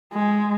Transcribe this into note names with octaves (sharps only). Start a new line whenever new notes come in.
G#3